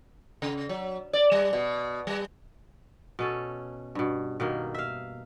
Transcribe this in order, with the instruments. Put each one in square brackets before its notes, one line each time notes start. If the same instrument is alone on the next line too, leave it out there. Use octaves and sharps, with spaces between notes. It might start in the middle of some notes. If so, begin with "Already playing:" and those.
[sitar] C#3
F#3
D5
G3
B2
G3
[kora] B2 C#4 A4
G2 B2
B2 D#3 A#3
E5 F5